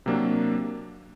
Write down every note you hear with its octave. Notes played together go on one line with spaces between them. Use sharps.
C3 F#3 A#3 D4